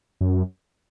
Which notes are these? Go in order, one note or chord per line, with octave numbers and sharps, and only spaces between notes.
F#2